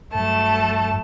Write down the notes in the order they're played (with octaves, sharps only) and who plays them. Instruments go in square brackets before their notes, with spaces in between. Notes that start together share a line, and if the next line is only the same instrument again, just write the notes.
[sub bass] G2 [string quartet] F#3 A3 A5